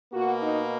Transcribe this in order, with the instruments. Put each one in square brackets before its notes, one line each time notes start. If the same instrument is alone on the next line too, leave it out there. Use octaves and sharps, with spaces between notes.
[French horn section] B2 A#3 F#4
D#4